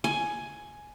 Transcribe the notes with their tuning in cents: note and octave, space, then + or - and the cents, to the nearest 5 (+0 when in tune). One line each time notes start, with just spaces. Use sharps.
G#5 +10